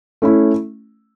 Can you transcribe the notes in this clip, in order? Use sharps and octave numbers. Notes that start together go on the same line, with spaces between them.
A3 C#4 E4